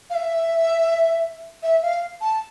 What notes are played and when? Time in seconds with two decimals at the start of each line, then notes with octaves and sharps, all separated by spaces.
0.10 F5
0.15 E5
1.63 E5
1.82 F5
2.21 A5